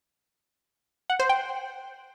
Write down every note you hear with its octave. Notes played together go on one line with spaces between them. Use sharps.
F#5
C5
G5